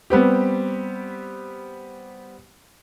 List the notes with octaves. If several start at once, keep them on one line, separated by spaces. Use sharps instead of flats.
G3 B3 C4 G4